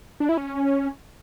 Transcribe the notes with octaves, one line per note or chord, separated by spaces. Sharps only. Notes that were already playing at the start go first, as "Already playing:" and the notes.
D4
E4
C#4